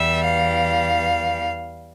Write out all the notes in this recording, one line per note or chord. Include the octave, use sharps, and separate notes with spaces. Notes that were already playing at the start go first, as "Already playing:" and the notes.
Already playing: E2 E3 G3 E5
F5